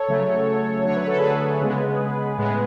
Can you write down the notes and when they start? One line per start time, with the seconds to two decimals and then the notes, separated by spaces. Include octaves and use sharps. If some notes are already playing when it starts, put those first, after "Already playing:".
Already playing: A4 C#5
0.08 C#3 F#3 A3
0.84 D3 F#3 A3 C#5
0.96 B4
1.07 A4
1.18 G#4 B4
1.61 C#3 G#3 B3
2.38 A2 G#3 B3